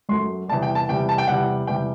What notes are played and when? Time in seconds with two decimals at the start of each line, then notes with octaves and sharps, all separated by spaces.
0.09 F#2 F#3 A3 C6
0.48 E2 C3 G3 A5
0.62 G5
0.75 A5
0.89 E2 C3 G3 G5
1.09 A5
1.18 G5
1.28 E2 C3 G3 F#5
1.67 E2 C3 G3 G5